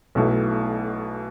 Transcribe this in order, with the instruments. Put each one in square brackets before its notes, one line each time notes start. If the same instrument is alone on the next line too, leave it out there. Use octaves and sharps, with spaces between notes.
[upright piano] B1 B2 A3 E4